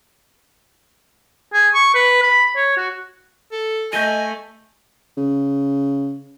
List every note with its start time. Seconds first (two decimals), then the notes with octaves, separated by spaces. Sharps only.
1.53 G#4
1.74 C#6
1.95 B4
2.23 B5
2.56 C#5
2.77 F#4
3.52 A4
3.93 A3 D#5 G#5 G6 D#7
5.17 C#3